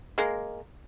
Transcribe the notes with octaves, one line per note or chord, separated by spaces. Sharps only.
G#3 A#3